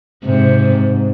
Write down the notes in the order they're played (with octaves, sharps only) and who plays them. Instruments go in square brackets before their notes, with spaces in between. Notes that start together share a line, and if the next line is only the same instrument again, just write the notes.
[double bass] G#2 [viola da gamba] C3